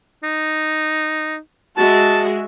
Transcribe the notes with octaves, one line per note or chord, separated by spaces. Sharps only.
D#4
G#3 F#4 E5 A5